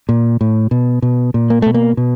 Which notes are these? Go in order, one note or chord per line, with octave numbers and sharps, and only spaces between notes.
A#2
A2
B2
B2
A#2
A#3
B2 A3
A#3
B2